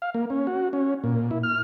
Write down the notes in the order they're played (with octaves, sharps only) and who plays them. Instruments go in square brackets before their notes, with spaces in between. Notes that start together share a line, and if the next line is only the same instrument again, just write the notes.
[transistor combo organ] F5
A#3
C#4
F#4
C#4
A#2
E4
F6